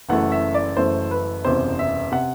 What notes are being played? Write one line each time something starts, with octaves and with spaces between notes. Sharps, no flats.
F#1 F#2 E3 A3 F#5
E5
D5
F#1 F#2 E3 A3 C5
B4
F#1 E2 C3 C5
E5
C3 F#5